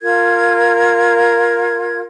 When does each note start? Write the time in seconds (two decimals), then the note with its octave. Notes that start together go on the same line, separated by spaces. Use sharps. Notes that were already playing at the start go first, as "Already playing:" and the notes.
0.01 F4 A#4 G#6